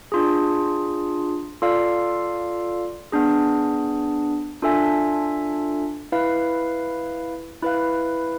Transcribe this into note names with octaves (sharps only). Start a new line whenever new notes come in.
D4 F4 G#4
F4 A4 D5 F5
B3 D4 G#4
D4 F4 A4 E5 G#5
E4 B4 F5
E4 B4 F5